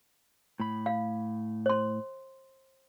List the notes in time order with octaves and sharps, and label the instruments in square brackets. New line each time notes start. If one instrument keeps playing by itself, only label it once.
[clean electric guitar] A2 B5
[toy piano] F5
C5 C6